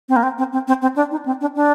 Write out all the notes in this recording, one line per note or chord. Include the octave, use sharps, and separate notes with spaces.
C4
A#3
C4
C4
C4
C4
C4
D4
D#4
C4
D4
D4